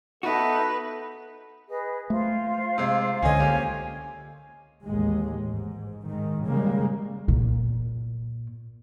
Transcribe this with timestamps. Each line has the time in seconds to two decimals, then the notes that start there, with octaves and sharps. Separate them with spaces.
0.23 B3 D#4 F#4 A4 B4 D#5 E5
1.69 G#4 B4 D#5
2.10 A3 F4 C5 F5
2.78 C3 G#3
3.23 C#2 D3 C#4 D#5 G#5
3.40 A#3 C#4 G4
4.85 A1 D#2 G#3
5.42 G#2
6.05 G#2 D#3
6.45 C#3 G3 G#3 A#3
7.28 A#2